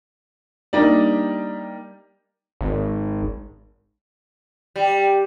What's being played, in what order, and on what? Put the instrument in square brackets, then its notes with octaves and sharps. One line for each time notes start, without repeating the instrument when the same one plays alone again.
[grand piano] G3 A#3 D4 D#4 G4 D5
[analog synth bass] G#1
[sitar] G3